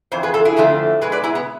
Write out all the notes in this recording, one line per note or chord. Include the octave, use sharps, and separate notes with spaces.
F2 E3 C5
G#4 B4
F4 A4
E4 G#4
F2 D3 F3 A3
B2 G#3 G#4 B4
B4 D5
E4 G#4
B3